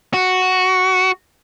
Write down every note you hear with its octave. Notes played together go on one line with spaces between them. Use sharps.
F#4